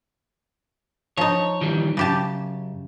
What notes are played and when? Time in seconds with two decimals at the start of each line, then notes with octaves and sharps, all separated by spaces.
1.17 F3 D#4 C#5
1.61 D#3 E3 G3
1.97 F#2 C#3 G4 A5